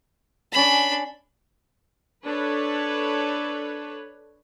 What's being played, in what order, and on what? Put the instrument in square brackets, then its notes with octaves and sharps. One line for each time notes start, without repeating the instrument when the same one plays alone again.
[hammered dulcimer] C#4 A5 [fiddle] D4 B5
[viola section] D4 A4 B4 C#5